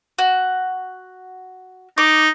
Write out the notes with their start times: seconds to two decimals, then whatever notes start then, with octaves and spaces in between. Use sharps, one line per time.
0.19 F#4
1.98 D#4 D6